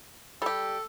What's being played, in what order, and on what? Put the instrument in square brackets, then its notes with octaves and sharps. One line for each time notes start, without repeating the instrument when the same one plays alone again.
[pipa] G3 G4 [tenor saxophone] A4